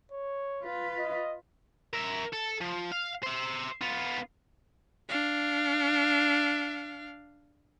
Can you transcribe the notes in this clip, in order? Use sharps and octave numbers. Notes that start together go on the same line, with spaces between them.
C#5
F4 B4
D#5
A#4 E5
A4
F3
F5
C5 E5
B3 F4
D4 F5